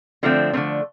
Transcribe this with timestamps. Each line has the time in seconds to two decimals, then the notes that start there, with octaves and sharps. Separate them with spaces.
0.23 D3 F3 A3 C4
0.53 D3 F3 A3 C4